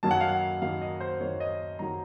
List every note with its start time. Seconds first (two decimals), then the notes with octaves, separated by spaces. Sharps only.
0.03 F#2 D#3 F#3 A#3 A5
0.11 F#5
0.20 F5
0.28 F#5
0.62 F#2 D#3 F#3 A#3 F5
0.82 D#5
1.00 C5
1.20 F#2 D#3 F#3 A#3 C#5
1.40 D#5
1.79 F#2 D#3 F#3 A#3 A#5